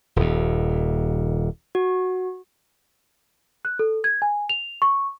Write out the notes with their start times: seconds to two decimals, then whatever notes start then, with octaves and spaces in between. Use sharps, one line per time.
0.16 D#1 D#2
1.75 F#4
3.65 F#6
3.79 A4
4.04 G#6
4.22 G#5
4.49 F7
4.82 C#6